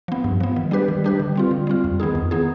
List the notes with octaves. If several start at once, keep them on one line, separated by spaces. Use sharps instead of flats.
F3 B3
G2
F3 B3
D#3
G3 D4 G4 B4
D#3
G3 D4 G4 B4
D3
G3 C4 F4
D3
G3 C4 F4
F2
D#3 B3 D#4 G#4
F2
D#3 B3 D#4 G#4